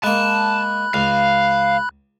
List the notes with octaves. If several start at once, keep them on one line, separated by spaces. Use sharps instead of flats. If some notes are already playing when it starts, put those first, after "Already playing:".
G#3 A#3 A5 B5 F#6
C#2 F5